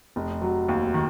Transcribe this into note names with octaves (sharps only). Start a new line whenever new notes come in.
F1
F#3
D#2
D#3